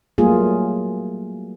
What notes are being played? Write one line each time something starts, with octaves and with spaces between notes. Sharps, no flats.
F#3 G3 A3 A#3 F4 G#4